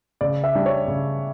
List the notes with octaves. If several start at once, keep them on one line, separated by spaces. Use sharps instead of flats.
C#3 D5
E5
G3 D4
C#5
C#3